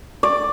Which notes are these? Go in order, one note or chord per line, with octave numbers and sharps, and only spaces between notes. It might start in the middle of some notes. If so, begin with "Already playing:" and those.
D5